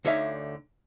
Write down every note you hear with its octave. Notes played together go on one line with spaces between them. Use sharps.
D2 D3 D#4 C#5 E5 F5